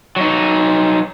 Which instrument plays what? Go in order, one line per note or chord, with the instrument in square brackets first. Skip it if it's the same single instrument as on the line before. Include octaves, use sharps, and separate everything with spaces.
[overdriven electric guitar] F#3 D#4